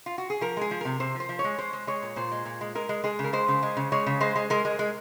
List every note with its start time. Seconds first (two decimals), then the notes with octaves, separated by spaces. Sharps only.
0.06 F4
0.18 F#4
0.30 G#4
0.41 F3 A#4
0.57 G#3 G#4
0.71 F3
0.81 C3 A#4
1.00 C3 C5
1.15 F3
1.20 C5
1.29 F3
1.39 C#5
1.44 G#3
1.58 G#3 C5
1.73 G#3
1.87 G#3 C#5
2.02 A#2
2.16 A#2 C5
2.32 G#3
2.46 A#2
2.61 G#3
2.75 G#3 A#4
2.89 G#3
3.04 G#3 G#4
3.19 C#3
3.24 A#4
3.33 G#3 C5
3.48 C#3
3.63 G#3
3.77 C#3
3.92 G#3 C#5
4.06 C#3
4.21 G#3 C5
4.36 G#3
4.50 G#3 A#4
4.65 G#3
4.79 G#3